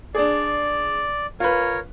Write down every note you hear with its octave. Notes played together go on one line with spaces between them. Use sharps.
D4 G#4 D5
F4 A#4 B4 C#5